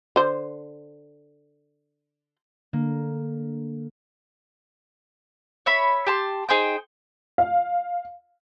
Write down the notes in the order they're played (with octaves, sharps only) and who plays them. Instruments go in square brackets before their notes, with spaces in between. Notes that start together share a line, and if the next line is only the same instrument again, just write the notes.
[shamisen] D3 C5
[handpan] D3 [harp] A#3
[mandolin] C#5 E5 B5
G4 A5 C6
D#4 G#4 C5 G5
[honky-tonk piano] F5